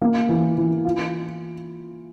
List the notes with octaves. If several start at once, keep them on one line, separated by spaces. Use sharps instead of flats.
A#3
E3
E3
F4